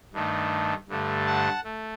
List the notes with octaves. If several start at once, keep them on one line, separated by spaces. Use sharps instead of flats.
G2 D#3 A3
G2 D3 A3
F#5 A5
A3